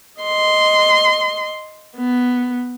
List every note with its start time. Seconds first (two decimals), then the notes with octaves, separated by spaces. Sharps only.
0.21 D#5 C6
1.97 B3